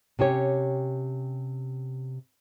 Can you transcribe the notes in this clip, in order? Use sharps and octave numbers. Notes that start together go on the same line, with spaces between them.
C3 C#4 G4 C#5